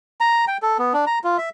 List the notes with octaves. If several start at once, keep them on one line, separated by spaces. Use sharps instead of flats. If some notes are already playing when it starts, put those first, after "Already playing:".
A#5
G5
A4
B3
D4
A#5
F4
E5